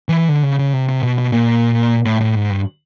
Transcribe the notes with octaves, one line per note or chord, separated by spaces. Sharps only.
E3
D3
C#3
C#3
C3
C3
B2
B2
A#2
A2
A2
G#2
G2